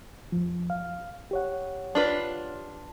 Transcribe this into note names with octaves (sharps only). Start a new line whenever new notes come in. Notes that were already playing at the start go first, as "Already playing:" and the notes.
F2 F3
F5
G4 C#5 F#5
D4 F4 B4